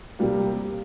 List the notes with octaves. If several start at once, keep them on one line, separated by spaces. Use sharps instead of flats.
C3 G3 A#3